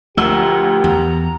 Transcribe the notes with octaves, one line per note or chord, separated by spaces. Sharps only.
D2 F3 G4 A#4 F#5 E6
E2 A#5